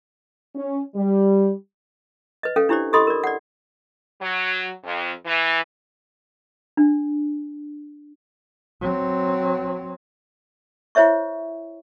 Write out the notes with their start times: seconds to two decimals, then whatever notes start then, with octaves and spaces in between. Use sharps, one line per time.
0.55 C#4
0.96 G3
2.43 B4 D#5
2.56 C#4 A4 F5 G5
2.69 D4 E4 G4 C5 D5
2.93 G4 A4 D#5 B5 C6 D#6
3.07 A#4 D5
3.24 D5 F#5
4.21 F#3
4.84 F2
5.26 E3
6.77 D4
8.81 F#3 C4
10.95 E4 C5 C#5 E5 C#6